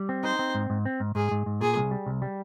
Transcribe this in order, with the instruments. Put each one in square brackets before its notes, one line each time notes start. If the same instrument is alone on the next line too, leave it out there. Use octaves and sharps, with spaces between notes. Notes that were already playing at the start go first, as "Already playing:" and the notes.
Already playing: [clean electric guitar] G3
C4
[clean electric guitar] D#4 [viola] C5
[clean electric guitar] C4
G#2
G#2
C4
G#2
[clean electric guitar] G#2 [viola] G#4
[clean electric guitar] G#2
G#2
[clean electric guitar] A#2 [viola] G#4
[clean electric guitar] C2
G3
C2
G3